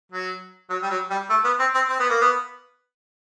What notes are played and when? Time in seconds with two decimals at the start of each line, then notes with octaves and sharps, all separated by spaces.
0.12 F#3
0.70 F#3
0.82 G3
0.90 F#3
1.10 G3
1.30 A3
1.44 B3
1.59 C4
1.74 C4
1.88 C4
1.99 B3
2.10 A#3
2.21 B3